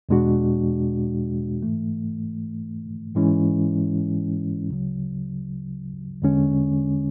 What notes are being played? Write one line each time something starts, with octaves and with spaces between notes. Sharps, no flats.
E2 B2 G#3 D4 F#4
G#2 E3 A3
G#2 E3 G#3 C#4 E4
D2 C#3 F#3
E2 D3 G#3 C#4